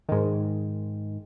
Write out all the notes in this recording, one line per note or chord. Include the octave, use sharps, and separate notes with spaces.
G#2 D#3